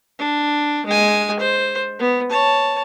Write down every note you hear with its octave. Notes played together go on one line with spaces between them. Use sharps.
D4
G#3 G#5
C5
B3
C#5 A5